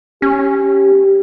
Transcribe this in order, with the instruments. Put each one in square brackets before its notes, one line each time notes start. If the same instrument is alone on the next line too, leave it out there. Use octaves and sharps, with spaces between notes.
[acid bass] C#4 [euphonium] G4